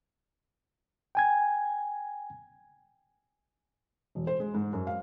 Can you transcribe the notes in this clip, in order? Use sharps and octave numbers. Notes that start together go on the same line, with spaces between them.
G5 G#5 G#6
E1
C5
G#3
G#2
F#2
F5